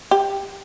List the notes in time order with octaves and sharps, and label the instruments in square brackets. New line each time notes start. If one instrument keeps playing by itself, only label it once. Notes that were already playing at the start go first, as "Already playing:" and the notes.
[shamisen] G4